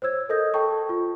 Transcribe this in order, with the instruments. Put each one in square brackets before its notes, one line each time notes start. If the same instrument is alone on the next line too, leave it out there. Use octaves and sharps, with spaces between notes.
[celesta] C5 C#5 E6 G#6
A4 A#4 D#5 D#6 G6 A#6
A4 G5 A5 C#6
F4